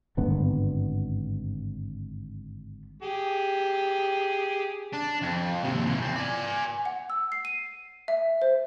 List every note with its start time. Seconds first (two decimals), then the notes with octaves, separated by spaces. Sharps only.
0.17 G#1 G2 D3 B3
3.02 G4 G#4
4.93 D4
5.22 F2
5.63 D#2 C3
5.86 B2 E3
6.02 E2 C4
6.16 D5 G#5
6.85 F#5
7.10 E6
7.32 C7
7.45 D#7
8.08 E5
8.42 C5